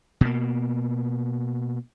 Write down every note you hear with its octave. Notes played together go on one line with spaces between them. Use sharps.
B2 A#3